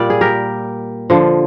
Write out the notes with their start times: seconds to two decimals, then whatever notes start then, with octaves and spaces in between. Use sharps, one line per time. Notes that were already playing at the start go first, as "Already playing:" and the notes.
Already playing: A#2 G3 D5
0.10 G#4
0.21 G4 A#4
1.10 D3 F3